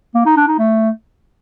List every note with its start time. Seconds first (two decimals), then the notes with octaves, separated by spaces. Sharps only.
0.15 A#3
0.26 D#4
0.37 D4
0.48 D#4
0.59 A3